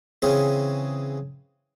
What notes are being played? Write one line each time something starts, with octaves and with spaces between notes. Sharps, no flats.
C#3 E3 C4 C#4 G#4